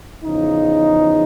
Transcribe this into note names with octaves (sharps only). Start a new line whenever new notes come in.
E2 C#3 F3 D#4